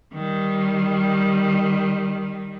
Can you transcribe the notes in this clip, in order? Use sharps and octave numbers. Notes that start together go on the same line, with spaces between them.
D#3 G3